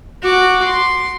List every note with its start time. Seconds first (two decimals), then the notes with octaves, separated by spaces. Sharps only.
0.23 F#4 D6
0.64 C6